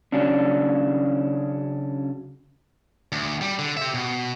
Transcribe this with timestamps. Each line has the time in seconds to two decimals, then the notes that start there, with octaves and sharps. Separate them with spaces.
0.12 C#3 F#3 C#4 D4
3.12 D2
3.41 G3
3.59 D3
3.77 G4 E5
3.94 B2